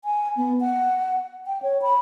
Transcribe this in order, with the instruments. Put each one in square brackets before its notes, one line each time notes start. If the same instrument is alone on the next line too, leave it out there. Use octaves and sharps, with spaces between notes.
[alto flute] G#5
B3
F#5
G5
C#5
B5